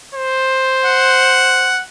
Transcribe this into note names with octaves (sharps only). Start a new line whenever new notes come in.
C5
F#5